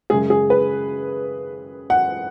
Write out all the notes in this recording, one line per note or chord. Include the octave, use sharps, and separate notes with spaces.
F#2 C#3 G#3 G#4
G#4
B4
F#5